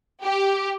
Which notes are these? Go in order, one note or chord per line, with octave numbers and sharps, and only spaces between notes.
G4